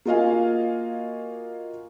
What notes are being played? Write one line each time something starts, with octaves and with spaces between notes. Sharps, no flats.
A#3 F4 F#4 D#5 F5 G#5